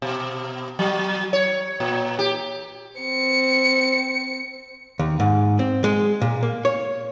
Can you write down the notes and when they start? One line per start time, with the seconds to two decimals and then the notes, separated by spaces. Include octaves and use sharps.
0.02 B2
0.79 F#3
1.33 C#5
1.80 A#2
2.19 G4
3.01 C4 C#7
4.99 D#2
5.20 G#2
5.59 C4
5.84 G#3
6.22 A#2
6.43 A#3
6.65 C#5